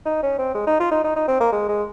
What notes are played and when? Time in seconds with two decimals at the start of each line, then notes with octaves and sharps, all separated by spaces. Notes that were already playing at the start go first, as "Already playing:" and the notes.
0.06 D#4
0.23 C#4
0.39 C4
0.55 G#3
0.67 D#4
0.80 F4
0.92 D#4
1.04 D#4
1.16 D#4
1.28 C4
1.40 A#3
1.52 G#3
1.68 G#3